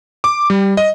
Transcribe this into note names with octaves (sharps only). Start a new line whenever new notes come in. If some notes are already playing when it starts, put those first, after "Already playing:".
D6
G3
D#5